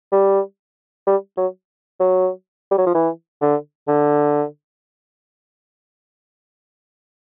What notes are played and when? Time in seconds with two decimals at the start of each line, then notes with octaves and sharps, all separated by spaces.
0.12 G3
1.07 G3
1.37 F#3
2.00 F#3
2.71 G3
2.78 F#3
2.86 F3
2.95 E3
3.41 D3
3.88 D3